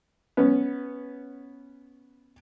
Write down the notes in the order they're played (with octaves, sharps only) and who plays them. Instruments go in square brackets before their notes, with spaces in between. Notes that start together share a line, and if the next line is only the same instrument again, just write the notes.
[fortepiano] B3 C#4